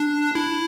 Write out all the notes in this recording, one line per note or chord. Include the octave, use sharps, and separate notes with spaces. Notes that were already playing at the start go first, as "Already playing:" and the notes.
Already playing: D4
E4